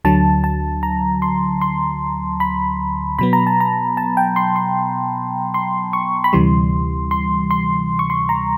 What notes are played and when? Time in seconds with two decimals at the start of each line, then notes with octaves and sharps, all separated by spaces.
0.05 D2 D3 F#3 A5
0.44 A5
0.83 A#5
1.22 C6
1.61 C6
2.40 B5
3.19 B2 F#3 B3 B5
3.33 A#5
3.47 A5
3.60 A#5
3.97 A5
4.17 G5
4.36 C6
4.56 C6
5.54 C6
5.93 C#6
6.24 B5
6.33 D2 C3 E3 G3 C6
7.11 C6
7.51 C6
7.99 C#6
8.10 C6
8.29 A#5